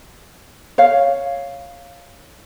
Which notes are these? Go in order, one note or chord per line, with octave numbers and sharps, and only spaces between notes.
C#5 F5